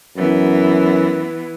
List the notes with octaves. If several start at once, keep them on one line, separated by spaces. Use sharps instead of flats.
F#2 E3 B3